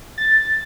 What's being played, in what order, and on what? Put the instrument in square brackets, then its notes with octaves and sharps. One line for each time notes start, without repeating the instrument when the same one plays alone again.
[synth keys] A6